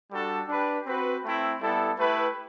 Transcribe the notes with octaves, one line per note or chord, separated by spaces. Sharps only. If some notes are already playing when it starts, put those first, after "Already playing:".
G3 D4 F#4 A4
D4 G4 B4
C4 F#4 B4
A3 C4 E4
G3 B3 E4 A4
A3 E4 G4 B4